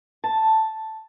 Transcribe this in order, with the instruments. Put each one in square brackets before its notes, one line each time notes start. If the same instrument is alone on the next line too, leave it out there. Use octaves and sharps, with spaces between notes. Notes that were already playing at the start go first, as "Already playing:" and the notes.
[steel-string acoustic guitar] A5